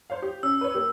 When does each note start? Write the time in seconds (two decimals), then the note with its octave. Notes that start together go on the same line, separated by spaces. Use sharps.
0.10 C5 C#5 F5
0.22 G4
0.43 C#4 E6
0.61 B4 C#5
0.74 A#3 G4